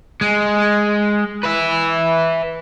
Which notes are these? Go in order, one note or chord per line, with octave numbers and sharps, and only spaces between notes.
G#3
B4 E5